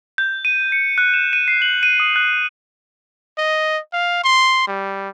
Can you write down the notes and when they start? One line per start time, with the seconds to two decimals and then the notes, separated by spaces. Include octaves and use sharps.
0.18 G6
0.45 D#7
0.72 C#7
0.98 F#6
1.14 E7
1.33 D#7
1.48 C7
1.62 F#7
1.83 D#7
2.00 D#6
2.16 F#6
3.38 D#5
3.93 F5
4.24 C6
4.67 G3